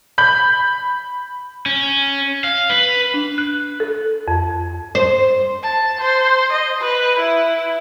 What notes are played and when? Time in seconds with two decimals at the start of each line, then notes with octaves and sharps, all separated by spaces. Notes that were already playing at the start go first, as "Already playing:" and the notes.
0.18 B5 G6 F#7
1.66 C#4
2.44 F5
2.70 B4
3.14 D4
3.38 F#6
3.80 A4
4.28 F2
4.95 C5
5.63 A5
6.01 C5
6.52 D#5
6.80 B4
7.19 E4